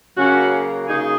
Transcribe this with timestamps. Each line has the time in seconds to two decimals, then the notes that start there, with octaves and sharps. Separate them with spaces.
0.17 C#3 F#3 A#3 C#4 F#4
0.88 C#3 F#3 A#3 D#4 G#4